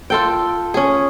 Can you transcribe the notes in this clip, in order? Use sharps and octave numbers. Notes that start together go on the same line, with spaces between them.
F4 A4 G5
C#4 G#4